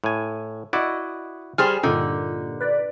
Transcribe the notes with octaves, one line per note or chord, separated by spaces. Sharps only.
A2 G#5
E4 F#4 D5 D#5
G3 G#4 C5 G#5 F6
G2 A#2 D3 D#4
B4 D5